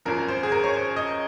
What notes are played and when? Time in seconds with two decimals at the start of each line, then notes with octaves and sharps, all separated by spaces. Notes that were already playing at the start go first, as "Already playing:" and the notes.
0.05 G#1 F#2 F3 A#4
0.28 C5
0.43 G#4
0.52 A#4
0.64 C#5
0.74 C5
0.96 D#5